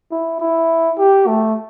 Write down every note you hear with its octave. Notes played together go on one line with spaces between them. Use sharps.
E4
E4
G4
A3